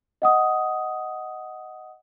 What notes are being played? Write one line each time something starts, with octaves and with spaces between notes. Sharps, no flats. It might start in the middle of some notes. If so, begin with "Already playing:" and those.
D#5 F#5 D#6